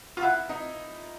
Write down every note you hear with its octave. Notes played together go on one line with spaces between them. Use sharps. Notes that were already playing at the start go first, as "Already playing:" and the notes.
F4
E4 F#5
D#4